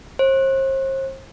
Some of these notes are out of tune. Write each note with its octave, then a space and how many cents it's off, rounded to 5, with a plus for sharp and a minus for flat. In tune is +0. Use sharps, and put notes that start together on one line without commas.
C5 +40